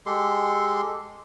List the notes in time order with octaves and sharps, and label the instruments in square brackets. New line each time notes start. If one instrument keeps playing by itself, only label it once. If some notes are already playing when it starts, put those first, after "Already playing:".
[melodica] G#3 G4 A4 C6